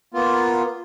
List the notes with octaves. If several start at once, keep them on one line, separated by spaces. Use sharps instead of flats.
A#3 B3 F4